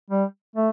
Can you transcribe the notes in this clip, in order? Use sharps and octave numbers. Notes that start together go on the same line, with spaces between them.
G3
A3